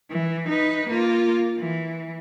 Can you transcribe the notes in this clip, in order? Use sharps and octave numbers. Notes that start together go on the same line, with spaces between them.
E3
D#4 B4
A#3 F4
E3